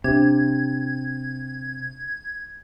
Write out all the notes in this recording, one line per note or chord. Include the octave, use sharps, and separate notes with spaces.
C3 D4 G#6